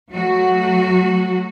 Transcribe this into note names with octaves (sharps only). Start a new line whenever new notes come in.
F#3 A3 F#4